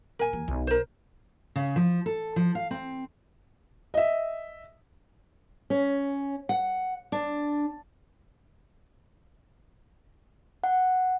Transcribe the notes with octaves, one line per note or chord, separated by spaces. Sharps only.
D#1 A#4 G#5
D#2 E3
B1
A#4 C5
C#3
F3
A4
F3
F5
C4
D#5 E5
C#4
F#5
D4
F#5